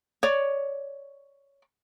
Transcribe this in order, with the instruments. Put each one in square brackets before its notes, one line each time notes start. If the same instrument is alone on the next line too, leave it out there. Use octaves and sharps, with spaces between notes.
[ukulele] C#5 D5